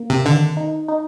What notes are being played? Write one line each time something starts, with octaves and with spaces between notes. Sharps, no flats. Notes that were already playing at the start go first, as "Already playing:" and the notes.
Already playing: A#3
C3
D3 D#3
D#4
D#4